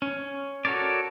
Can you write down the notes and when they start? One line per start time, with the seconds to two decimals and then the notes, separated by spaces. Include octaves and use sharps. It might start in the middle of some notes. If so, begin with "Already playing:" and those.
0.02 C#4
0.65 F#4 A4 A#4 C#5 D5